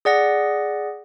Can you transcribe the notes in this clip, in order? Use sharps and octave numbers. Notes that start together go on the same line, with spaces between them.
G#4 D5 F#5 A#6